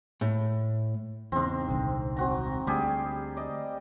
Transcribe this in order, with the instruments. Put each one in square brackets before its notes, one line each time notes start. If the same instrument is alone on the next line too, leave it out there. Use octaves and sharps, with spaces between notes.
[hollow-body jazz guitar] A2
[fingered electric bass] E2 C#3 [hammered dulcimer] G#2 C4
[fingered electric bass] D#1 C2 D3
[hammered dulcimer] C4 F#4 A#5
[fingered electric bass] D2 [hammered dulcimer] G3 G4 G#4
[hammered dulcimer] D5 D#5